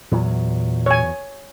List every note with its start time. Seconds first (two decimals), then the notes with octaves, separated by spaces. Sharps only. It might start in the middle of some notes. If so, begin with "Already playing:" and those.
0.12 E2 A#2 F#3
0.86 C#5 G#5